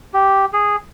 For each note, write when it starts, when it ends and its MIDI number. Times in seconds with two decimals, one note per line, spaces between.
0.14 0.45 67
0.53 0.76 68